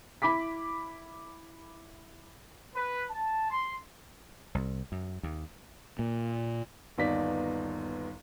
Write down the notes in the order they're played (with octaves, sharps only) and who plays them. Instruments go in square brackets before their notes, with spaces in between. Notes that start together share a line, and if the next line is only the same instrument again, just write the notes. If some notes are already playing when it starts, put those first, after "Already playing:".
[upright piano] E4 B5 D6 B6
[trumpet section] B4
A5
C6
[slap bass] C2
F#2
D#2
[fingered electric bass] A#2
[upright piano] G1 D#2 B3 D#4 D5 B6